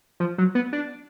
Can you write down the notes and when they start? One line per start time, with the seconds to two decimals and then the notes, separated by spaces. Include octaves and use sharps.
0.20 F3
0.38 F#3
0.55 B3
0.73 D4